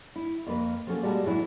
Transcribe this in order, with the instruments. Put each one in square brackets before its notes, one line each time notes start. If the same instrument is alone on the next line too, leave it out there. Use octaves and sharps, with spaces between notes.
[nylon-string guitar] E4
F2 A#3 B4
F3 F#3 A#3 C#4 A4
A#2 G3 G#3 F#4 G5 A5
E2 A2 E3 F#3 G#3 E4